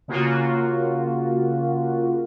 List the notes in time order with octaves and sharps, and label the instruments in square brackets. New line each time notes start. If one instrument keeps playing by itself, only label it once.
[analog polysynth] C#3 A#3 F4 F#4